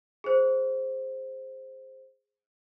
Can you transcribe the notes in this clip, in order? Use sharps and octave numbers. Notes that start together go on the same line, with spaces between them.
G#4 C5